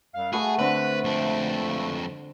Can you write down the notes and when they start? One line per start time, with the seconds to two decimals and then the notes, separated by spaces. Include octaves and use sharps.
0.14 F#2 G3 F5
0.33 A3 F#4 G#4 A4 B4
0.59 D3 C4 B4
1.04 F2 D4